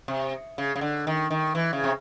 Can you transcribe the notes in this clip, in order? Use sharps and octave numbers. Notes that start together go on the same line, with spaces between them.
C3
C#3
C#3
D3
D#3
D#3
E3
C#3
C3